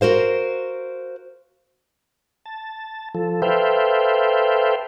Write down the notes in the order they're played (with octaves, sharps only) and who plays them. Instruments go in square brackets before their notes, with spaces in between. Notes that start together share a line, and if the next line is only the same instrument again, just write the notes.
[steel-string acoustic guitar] F#4 A#4 C5 F5
[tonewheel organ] A5
F3 A4
A4 B4 C5 E5 F5 G5